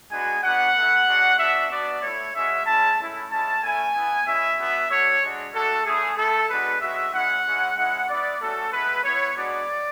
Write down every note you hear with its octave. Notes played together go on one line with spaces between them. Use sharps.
G#3 B3 D4 F#4 G#5
B3 D4 F#4 F#5
A3 E4
G#3 D4 F#4
B3 D4 F#4 E5
B3 D4 F#4 D5
A3 E4 C#5
G#3 C#4 F#4 E5
G#3 C#4 E4 A5
A3 C#4 E4
G#3 C#4 E4 A5
A3 C#4 E4 G#5
B3 E4
G#3 C#4 E4 E5
B3 D4 F#4
A3 D4 F#4 C#5
G#3 D4 F#4
A3 D4 F#4 A4
A3 C#4 E4 G#4
A3 E4 A4
G#3 B3 D4 F#4 B4
G#3 C#4 F#4 E5
G#3 C#4 E4 F#5
G#3 C#4 E4
G#3 C#4 E4 F#5
B3 E4 D5
A3 C#4 F#4 A4
G#3 B3 E4 B4
B3 E4 C#5
G#3 B3 D4 F#4 D5